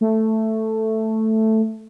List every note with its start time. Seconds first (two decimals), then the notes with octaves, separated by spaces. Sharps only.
0.01 A3